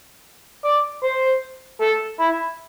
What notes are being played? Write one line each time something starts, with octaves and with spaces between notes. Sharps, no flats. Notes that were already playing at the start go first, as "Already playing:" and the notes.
D5
C5
A4
E4